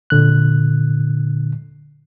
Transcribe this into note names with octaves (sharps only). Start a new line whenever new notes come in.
A#2 D3 F#6